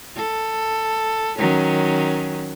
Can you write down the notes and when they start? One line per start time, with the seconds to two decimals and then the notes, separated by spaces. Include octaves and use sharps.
0.16 A4
1.38 D#3 F#3 C#4